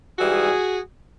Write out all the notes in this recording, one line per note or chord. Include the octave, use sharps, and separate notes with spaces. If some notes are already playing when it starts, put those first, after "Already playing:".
G#2 E3 G3 F#4 G#4